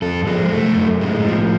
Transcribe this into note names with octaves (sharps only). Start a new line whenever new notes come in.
F2 A4
F3 G#4
G#3
F#2 A3
F#2
A2 G#3
F3